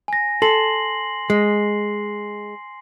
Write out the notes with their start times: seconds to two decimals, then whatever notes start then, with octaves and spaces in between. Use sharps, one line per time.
0.08 G#5 A#6
0.42 A4 C6 C7 F#7
1.30 G#3 C7